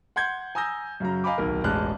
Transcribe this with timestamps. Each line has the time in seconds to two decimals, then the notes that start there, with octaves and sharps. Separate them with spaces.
0.16 F#5 C6 G6 G#6
0.55 G#5 A#5 D#6 E6 G6 A#6
1.00 F#2 C#3 F#3 A#5
1.24 D#5 F5 G#5 A#5 B5 D6
1.38 D1 B1 D#3 A#4
1.64 E1 A1 G#3 A5 F6 F#6